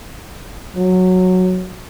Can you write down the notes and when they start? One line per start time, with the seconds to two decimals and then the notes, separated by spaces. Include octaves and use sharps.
0.76 F#3